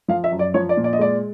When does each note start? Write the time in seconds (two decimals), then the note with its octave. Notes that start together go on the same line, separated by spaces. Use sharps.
0.08 F3 F5
0.24 E5
0.32 F#2
0.39 D5
0.54 F3 C#5
0.69 D5
0.77 A#2
0.84 D5
0.93 D#5
0.99 G#3 D5